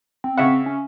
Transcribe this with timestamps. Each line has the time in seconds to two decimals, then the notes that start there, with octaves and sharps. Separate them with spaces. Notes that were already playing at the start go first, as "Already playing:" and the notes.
0.24 C4
0.38 C#3 E5 F#5
0.66 C#4